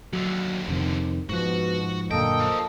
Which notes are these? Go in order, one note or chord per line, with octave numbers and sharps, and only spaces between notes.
D#2 D3 F#3
F2 C3 D#3
G#2 B2 F3 F#4 F#5
F#2 A#2 D3 A#3 A4 D#5 G5
F3